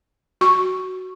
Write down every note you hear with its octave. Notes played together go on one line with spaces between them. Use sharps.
F#4 C#6